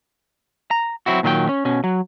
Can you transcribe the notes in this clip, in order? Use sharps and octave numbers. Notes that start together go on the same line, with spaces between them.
A#5
F#3 C4 E4 F#4
A#2 D#3 F#3 A4 G5
C#4
B2 C#4
F#3